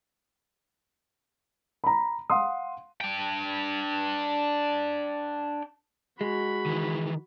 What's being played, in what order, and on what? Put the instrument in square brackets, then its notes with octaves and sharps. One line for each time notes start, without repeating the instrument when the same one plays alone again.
[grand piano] A#5 B5
F5 F#5 C6 D#6
[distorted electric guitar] D4 G5
[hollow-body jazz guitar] G#3 [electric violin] F#4 B5
[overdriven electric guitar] D#3 E3